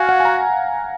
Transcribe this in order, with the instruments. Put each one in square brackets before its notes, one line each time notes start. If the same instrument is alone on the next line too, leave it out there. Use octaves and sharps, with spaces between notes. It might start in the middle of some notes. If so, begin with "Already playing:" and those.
Already playing: [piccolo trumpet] F#4 [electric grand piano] F5 G#5
[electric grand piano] F#5
G#5
A#5